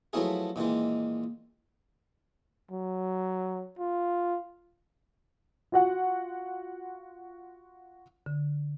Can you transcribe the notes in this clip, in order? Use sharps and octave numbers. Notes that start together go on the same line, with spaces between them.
F3 F#3 A3 B3 E4 G#4
A#2 D#3 E3 G#3
F#3
F4
F4 F#4 F#5
D3